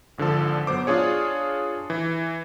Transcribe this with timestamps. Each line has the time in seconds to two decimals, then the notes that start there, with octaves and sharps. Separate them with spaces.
0.18 G#1 D3 F3 A4
0.67 F#3 B3 C5 D6
0.87 D4 F4 G#4 C#5
1.90 E3